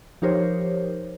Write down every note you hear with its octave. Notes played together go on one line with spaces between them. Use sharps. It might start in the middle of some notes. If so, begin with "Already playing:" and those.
F3 D#4 G4 A#4 C5 C#5